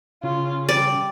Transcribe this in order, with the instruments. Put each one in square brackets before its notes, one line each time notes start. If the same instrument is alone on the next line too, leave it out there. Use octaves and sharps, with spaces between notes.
[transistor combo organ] C#3 [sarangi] F4
[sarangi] G3 [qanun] D5